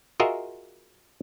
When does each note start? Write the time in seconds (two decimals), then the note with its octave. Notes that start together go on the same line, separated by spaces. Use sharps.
0.20 F4 F#4 G#4 A#4 D#5 E5